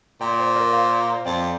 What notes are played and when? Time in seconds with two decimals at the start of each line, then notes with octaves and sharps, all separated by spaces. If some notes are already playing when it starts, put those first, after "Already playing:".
0.21 A#2 D5 G5
0.34 D5
0.39 C5
0.56 A#4 D5
0.73 C5 F5
1.25 F2 D5 G5